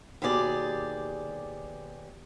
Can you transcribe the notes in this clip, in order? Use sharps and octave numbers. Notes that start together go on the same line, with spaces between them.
D#2 B2 G4 G#4 D5